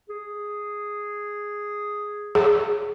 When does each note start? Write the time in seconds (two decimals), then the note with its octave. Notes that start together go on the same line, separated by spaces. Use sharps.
0.09 G#4
2.35 G#4